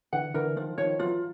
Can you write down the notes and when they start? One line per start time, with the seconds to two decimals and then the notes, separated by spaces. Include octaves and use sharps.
0.13 D3 E3 F#5
0.34 D3 E3 A#4
0.56 D#3 F3 F4
0.78 D#3 F3 C#5
0.99 E3 F#3 F4